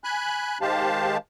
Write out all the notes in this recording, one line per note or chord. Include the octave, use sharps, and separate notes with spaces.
G#5 B5 F#6
D#3 G#3 G4 C5 F5 A5